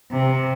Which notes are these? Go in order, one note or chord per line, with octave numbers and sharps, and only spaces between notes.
C3